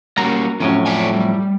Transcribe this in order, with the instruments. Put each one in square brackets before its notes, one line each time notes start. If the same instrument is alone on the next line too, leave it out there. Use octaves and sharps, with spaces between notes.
[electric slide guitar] G3 A#3 C#4 [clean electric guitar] F#4 A#5
[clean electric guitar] F2 A2 F#3 [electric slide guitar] C#4
[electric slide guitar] C#5 D5 G#5
G3